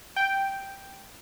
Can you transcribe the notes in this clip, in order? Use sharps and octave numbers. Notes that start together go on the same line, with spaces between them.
G5